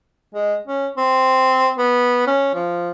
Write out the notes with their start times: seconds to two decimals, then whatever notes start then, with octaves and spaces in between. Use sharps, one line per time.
0.34 G#3
0.67 C#4
0.98 C4
1.78 B3
2.27 C#4
2.54 F3